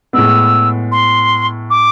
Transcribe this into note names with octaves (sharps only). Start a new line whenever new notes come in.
A2 G#3 B3 E6
C6
D6